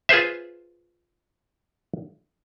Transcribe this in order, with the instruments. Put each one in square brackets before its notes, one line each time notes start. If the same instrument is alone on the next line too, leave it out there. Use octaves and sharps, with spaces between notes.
[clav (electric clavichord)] F4 G#4 B4 C5 E5